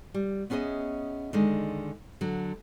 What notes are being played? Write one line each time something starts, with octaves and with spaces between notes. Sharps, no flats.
G3
B3 C#4 G#4 A#4 D#5 E5
D3 D#3 G#3
D3 F#3